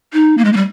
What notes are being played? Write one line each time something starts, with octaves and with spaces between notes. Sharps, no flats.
D#4
A#3
G#3
A#3
G3